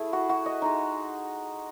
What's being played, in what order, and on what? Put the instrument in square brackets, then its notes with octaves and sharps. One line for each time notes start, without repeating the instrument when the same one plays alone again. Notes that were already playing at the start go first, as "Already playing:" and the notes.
Already playing: [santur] A3 E4 G#4
F#4
F#4
D#5
G#3 D#4